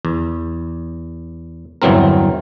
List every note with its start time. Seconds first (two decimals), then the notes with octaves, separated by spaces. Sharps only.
0.05 E2
1.82 G1 E2 E3 F#3 C4 A#4